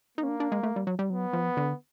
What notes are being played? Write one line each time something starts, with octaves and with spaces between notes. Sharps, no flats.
A#3 D#4
C#4
D4
D4
G#3
A3
G3
F#3
G3
F#3 B3
F3
D3